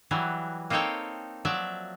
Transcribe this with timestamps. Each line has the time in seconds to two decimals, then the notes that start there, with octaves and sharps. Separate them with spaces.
0.11 E3 F#3 G3
0.70 A#3 C4 D#4 A4 C#5 G5
1.45 F3 F#3 D5 E5